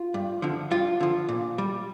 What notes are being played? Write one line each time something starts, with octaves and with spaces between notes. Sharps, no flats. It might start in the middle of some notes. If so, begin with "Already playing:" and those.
Already playing: F4
G2
D3 F3
G2 F4
D3 F3
A#2
G3